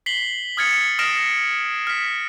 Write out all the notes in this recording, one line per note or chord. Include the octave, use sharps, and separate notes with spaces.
B6 C7 F#7 G7
D#6 F6 G#6 A6 C#7
D#6 F6 A#6 C7 D7 E7
F6 B6